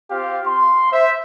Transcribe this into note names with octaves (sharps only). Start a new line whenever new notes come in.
C4 F4 G4 F5 G5
C6
C5 E5